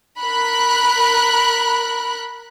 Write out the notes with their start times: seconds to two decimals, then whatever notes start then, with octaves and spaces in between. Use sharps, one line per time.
0.21 A#4 B5 F#6